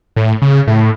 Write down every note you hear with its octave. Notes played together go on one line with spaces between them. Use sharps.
A2
C#3
A2